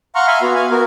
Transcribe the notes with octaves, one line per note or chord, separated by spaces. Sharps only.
F5 F#5 A#5 C6 C#6 F6
E5 F5 G#5 B5 C6
B3 F#4
F5 G#5
B3 F#4 A#4